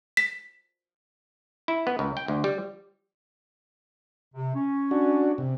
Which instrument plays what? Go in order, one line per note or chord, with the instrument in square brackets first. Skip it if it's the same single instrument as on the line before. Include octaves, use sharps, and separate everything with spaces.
[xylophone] B6
[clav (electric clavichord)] E4
B3
C#2
G5
D2
G3
[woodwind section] C3
C#4
[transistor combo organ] D4 F#4
C3